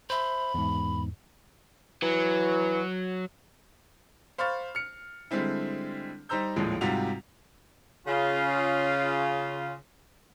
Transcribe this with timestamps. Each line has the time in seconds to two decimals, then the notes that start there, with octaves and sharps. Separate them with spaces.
0.10 C5 E5 B5
0.54 E2 G#2
2.02 E3 F#3
4.38 C5 F5 B5 C#6 F6 A6
4.75 F6 C#7
5.31 D3 G3 G#3 C4 E4
6.29 G3 D#4 C5 A#5 E6 G6
6.56 A#1 D#2 A2 F3 G#3
6.81 G#2 C3 G3 F4 F#4 F7
8.07 C#3 F4